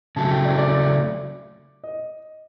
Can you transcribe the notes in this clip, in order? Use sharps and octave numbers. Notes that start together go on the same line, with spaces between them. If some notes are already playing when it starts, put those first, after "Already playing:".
C#3 F#3 A3 A5
G5
D5
D5
D#5